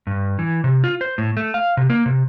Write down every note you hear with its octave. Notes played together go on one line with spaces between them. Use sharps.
G2
E3
C3
F4
C5
A2
A3
F5
C3
A#3
C3